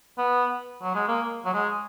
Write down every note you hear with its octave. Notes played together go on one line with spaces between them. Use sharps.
B3
F#3
G#3
A#3
F#3
G#3